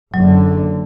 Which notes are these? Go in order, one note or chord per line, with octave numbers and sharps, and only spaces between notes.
F#1 D3 F#3